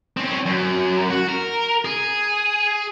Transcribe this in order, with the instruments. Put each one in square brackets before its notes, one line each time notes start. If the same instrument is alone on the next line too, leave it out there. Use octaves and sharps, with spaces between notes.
[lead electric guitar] C4 C#4
F#2
F#4
A#4
G#4